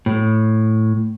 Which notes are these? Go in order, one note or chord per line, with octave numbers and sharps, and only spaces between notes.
A2